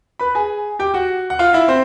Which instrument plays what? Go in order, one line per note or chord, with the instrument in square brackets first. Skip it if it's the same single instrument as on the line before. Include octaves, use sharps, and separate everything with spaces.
[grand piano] B4 B5
G#4 G#5
G4 G5
F#4 F#5
F#5
F4 F5
E4 E5
C4 C5